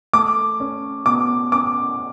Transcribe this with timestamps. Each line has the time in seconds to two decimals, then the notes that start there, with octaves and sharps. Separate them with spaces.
0.13 A3 D6
0.60 C#4
1.06 B2 D6
1.52 C#4 D6